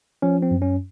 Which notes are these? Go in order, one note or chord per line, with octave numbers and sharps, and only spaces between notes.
F3 C#4
C4
F#2
C#4